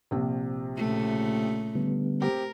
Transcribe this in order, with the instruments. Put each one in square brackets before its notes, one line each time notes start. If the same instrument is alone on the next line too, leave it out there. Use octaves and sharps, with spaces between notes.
[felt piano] A#1 C3
[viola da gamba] A#2 C#3 A3
[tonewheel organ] D3 G3 B3
[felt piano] C4 G4 [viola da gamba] A#4